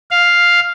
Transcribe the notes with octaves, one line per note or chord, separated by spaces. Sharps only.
F5